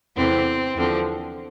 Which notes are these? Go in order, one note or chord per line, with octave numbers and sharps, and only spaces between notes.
E2 C3 E3 A3 C4
E2 D3 F3 C4